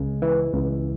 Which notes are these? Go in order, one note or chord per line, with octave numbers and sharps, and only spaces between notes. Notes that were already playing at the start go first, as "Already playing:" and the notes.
Already playing: C#2 G#3
E3
C#2